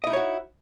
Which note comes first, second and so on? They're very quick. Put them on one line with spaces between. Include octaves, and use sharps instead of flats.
D#5 E4 D#4 C#5 F#4